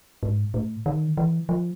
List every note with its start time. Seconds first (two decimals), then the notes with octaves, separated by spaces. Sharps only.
0.23 G#2
0.54 A2
0.86 D#3
1.17 E3
1.49 F3